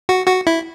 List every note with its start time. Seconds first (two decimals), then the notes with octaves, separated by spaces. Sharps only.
0.09 F#4
0.27 F#4
0.47 E4